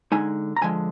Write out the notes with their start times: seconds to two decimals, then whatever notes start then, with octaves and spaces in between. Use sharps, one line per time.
0.12 D3 G#3 D#4 G#5
0.56 A#5
0.61 D3 F3 G#3 G#5